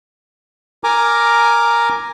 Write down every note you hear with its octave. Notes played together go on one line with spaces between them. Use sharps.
A#4 G#5 A#5 D6